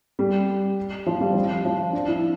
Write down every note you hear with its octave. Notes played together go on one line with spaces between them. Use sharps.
G3
F3
G3
F3
F3
D4
E4